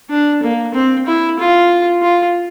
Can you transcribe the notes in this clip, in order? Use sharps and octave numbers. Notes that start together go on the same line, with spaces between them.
D4
A#3
C4
E4
F4
F4